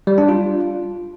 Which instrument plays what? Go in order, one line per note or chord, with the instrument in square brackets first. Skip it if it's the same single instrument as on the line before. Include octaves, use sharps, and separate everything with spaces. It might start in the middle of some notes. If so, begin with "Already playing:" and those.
[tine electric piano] G3
D4
F4